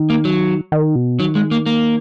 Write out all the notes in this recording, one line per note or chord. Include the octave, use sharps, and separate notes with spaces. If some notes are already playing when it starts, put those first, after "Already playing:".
Already playing: D#3
A#3
F#3
D#3
B2
D#3 F#3
G#3
A#3
A#3